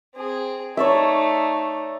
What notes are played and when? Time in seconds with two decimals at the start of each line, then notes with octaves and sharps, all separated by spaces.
0.15 C4 G#4
0.77 A3 D#4 C#5 D5 E5